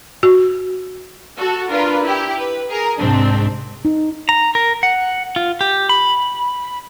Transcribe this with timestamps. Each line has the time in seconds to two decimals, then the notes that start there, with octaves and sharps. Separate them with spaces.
0.23 F#4
1.38 F#4 A4
1.70 D4 F4 A#4 B4
2.03 E4 G4
2.38 B4
2.69 G#4 A#4
2.98 C2 G#2 C4 D4
3.85 D#4
4.29 A#5
4.55 A#4
4.83 F#5
5.36 F4
5.61 G4
5.89 B5